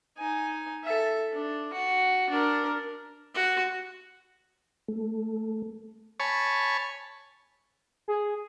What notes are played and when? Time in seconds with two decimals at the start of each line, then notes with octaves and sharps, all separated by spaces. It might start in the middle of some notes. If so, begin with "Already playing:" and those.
0.17 D#4 G#5
0.84 A4 E5
1.32 D4
1.73 F#4
2.30 D4 A#4
3.34 F#4
4.88 A3
6.20 C#5 G#5 A5 B5 C#6
8.08 G#4